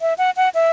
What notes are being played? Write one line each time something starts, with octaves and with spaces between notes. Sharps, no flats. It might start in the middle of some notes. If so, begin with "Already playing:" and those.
E5
F#5
F#5
E5